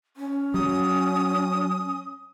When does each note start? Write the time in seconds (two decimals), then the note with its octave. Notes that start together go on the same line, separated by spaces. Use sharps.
0.17 C#4
0.54 F#3 D#6